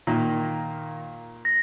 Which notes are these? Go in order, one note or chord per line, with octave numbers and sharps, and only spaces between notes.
A#2 D#3 A#3 F4
A#6